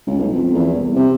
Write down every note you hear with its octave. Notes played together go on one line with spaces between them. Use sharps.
C#2
B1
F2
E2
C2
C3